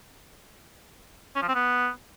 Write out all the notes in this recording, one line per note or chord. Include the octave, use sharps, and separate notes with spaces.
C#4
F3
C4
B3